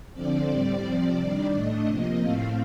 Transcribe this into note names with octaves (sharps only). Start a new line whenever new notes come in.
D3 F3 C4 D5
A2 G3 C4 D5
C3 F3 C4
D#3 G3 D4
A2 A3 D4 D#5
C3 F3 A#3
A2 A3 C4 F5